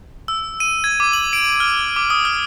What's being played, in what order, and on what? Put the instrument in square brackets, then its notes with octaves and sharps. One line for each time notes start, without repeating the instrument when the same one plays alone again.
[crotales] E6
D#7
G#6
D6
F#7
D7
F6
D6
D#6
F6